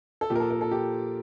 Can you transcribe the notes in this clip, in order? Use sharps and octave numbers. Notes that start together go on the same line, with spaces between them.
A4
A#2 F3 G4
A#4
A4
A#4
A4
G4